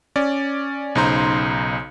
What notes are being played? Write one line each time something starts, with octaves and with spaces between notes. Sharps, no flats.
C#4 D5
B1 C#3 D#4 C5 A#5 C6